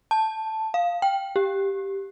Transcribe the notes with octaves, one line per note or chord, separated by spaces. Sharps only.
A5
F5
G5
G4